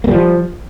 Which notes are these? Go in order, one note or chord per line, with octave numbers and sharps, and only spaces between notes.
F3 G3 A#3